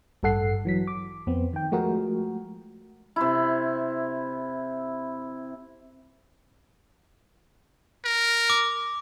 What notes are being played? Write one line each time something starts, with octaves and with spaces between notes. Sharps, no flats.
A1 G2 A4 F#5 C7
E3 F#3 B6
D6
F2 B3 C4
D#3 G5
F3 G#3 A3 F#4 G#4 A#4
C3 E4
A#4
D6